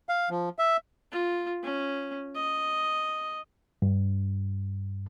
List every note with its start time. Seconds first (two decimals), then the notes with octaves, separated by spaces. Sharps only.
0.09 F5
0.30 F3
0.59 E5
1.12 F4
1.64 C#4
2.35 D#5
3.82 G2